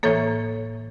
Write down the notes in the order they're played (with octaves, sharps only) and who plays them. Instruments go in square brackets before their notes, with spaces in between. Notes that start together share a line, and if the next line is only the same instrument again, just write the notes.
[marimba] A2 E3 A#3 A4 C#5